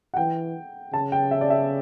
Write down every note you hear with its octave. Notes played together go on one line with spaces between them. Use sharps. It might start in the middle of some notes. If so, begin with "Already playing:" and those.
F#5
E3 G5
C#3 A5
G5
E5
D5
E5